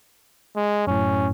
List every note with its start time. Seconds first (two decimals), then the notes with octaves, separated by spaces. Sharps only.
0.56 G#3
0.87 F#2 A2 C#4